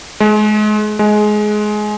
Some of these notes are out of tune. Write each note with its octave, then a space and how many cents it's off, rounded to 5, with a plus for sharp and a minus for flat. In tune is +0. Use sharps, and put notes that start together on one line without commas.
G#3 +35
G#3 +20